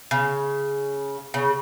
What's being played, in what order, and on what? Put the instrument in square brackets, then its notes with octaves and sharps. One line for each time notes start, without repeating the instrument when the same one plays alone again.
[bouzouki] C#3
C#3